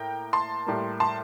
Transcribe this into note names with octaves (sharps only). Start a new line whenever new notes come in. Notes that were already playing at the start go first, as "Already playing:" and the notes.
Already playing: A2 A#3 G5 A#5
A5 C6
A2 G3 A#3
A5 C6